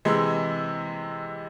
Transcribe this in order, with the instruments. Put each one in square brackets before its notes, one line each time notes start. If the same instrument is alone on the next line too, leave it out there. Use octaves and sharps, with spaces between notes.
[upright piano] C3 E3 G#3